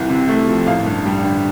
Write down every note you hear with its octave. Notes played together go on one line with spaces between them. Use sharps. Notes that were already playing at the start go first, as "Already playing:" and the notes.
Already playing: C2 E3
C3
A3
F3
A1 F5
G2
G3
D3